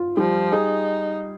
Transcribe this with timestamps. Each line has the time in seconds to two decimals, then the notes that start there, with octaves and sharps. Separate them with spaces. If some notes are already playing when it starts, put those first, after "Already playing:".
Already playing: F4
0.17 F3 G3
0.52 D#4 G#4